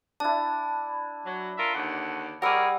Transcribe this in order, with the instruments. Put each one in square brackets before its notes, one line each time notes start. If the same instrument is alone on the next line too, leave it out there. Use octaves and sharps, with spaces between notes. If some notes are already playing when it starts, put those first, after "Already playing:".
[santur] D4 E4 [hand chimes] A5
[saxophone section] F#3
F4 A#4 E5
D#2 D3 F#5
[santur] G3 C#6 D6 [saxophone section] G#4 A#4 C#5 [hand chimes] F#5 E6